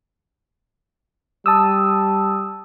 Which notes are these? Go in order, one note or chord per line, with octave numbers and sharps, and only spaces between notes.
G3 A5 D#6 E6